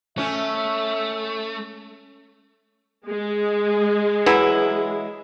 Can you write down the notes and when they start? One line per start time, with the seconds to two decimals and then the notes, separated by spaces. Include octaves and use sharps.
0.18 A3 C#4 E5
3.08 G#3
4.26 E3 F#3 E4